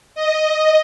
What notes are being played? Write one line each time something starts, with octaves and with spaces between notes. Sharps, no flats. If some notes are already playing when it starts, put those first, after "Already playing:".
D#5